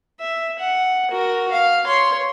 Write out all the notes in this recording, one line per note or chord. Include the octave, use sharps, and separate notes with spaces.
E5
F#5
F#4 A#4
F5
C#5 C6